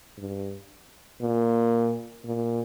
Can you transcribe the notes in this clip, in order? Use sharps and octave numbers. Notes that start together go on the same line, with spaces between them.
G2
A#2
A#2